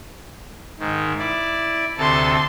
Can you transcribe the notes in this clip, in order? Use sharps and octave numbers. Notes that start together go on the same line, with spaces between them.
G#2 D#3
E4 D5
D2 C3 A4 A5 C6